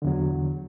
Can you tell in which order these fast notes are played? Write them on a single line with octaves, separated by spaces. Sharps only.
D3 E2 F#3